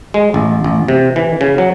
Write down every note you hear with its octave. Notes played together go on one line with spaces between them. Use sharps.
G#3
A1
A1
C3
E3
C#3
F#3